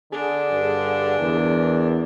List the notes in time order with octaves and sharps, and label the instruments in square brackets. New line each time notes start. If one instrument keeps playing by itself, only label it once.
[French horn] D3 [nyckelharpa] D4 [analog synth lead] G#4
[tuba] G2
[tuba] E2 [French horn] A#4